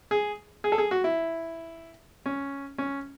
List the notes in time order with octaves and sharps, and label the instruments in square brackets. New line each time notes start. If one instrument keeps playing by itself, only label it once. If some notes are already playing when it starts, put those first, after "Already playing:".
[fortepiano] G#4
G#4
A4
G#4
F#4
E4
C#4
C#4